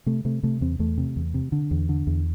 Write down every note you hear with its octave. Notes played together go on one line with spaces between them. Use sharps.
C3 A3
C3 A3
C3 A3
E2 C4
E2 A3
C3
E2
C3
D3
E2
D3
E2